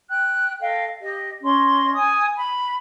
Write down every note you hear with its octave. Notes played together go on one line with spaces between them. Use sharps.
G5 F#6
A4 D#5 F5 G5
G4 D#5
C#4 D#5 C6
G#5 D#6
B5